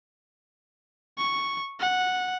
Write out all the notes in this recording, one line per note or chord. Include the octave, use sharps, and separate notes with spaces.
C#6
F#5